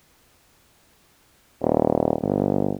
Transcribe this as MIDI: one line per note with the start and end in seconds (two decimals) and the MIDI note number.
1.62 2.15 27
2.22 2.73 31